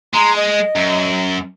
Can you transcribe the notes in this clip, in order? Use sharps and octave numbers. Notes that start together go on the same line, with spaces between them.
G#3 A#5 C6
D#5
F#2